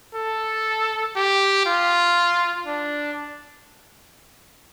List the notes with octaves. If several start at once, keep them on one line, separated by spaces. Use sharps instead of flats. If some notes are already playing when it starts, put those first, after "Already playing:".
A4
G4
F4
D4